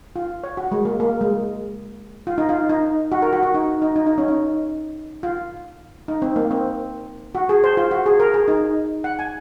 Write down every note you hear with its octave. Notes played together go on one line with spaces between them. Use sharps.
F4
C#5
F#4
G#3
A#3
A#3
G#3
F4
D#4
F4
D#4
F#4
A#4
F#4
F#4
D#4
D#4
D#4
D#4
C#4
D#4
F4
D#4
C4
A#3
C4
F#4
G#4
C5
F4
F#4
G#4
A#4
G#4
D#4
F#5
G#5